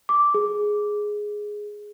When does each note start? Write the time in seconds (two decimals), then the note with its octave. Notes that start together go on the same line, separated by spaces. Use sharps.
0.09 D6
0.34 G#4